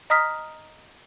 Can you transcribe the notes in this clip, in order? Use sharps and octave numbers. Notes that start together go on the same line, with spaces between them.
D#5 A#5 D#6 F6 B6